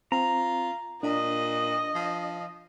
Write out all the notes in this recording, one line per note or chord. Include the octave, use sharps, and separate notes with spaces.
C4 F4 A#5
A#2 D4 D#5
F3